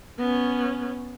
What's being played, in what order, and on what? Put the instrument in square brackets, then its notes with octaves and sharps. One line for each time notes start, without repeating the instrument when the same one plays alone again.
[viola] B3 C#4